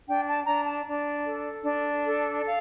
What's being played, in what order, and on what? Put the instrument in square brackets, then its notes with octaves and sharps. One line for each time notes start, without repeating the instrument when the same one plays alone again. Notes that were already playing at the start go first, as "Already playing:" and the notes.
[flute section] D4 G5
A5
D4 A#5
A5
D4
A4
D4
A4
F5